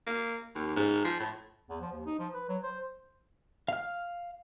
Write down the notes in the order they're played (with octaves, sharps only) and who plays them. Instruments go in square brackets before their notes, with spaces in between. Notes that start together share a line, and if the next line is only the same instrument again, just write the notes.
[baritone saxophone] A#3
D#2
G#2
F3
A2
[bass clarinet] E2
F3
D#2
D#4
F3
B4
F#3
C5
[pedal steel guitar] F5 F6